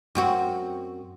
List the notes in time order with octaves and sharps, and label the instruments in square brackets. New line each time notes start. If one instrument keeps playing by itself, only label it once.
[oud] F#2 C4 F#4